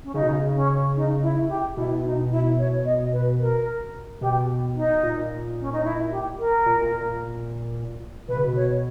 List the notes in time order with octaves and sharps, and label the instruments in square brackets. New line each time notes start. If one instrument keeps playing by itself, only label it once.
[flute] C#4
[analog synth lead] C#3 [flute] D#4
[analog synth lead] B2
C#3
[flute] C#4
D#4
E4
E4
G4
[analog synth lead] B2 [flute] E4
[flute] D#4
E4
C#5
D#5
B4
A#4
[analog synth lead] B2 [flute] G4
[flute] D#4
[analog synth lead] A#2
[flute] C#4
D#4
E4
G4
A#4
[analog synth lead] A#2
A#2
[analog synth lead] B2 [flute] B4
[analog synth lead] C#3
B2
[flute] C#5